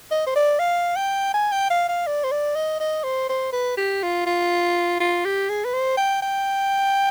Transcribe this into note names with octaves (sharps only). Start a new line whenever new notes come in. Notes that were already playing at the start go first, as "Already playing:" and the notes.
D#5
C5
D5
F5
G5
G#5
G5
F5
F5
D5
C5
D5
D#5
D#5
C5
C5
B4
G4
F4
F4
F4
G4
G#4
B4
C5
G5
G5